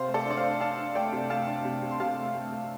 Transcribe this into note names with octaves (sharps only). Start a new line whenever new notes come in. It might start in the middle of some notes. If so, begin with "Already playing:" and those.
Already playing: C3 C5 F5
A3
A4 D5
D4 D5
C5 F5
D4
D4 F5 A5
D4
A3 D5 G5
C3
A3 F5 A5
D4
C3
C3
C6
C3 F5 A5
A3
A3
A3